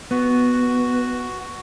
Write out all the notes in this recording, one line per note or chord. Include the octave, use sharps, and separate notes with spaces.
B3 F#4